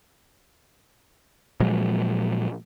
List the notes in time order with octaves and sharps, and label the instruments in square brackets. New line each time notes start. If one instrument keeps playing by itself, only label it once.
[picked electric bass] A#2 F3 F#3 G#3